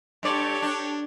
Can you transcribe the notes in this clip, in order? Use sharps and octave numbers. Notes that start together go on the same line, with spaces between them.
G2 G4 A4 C#5 D5
D4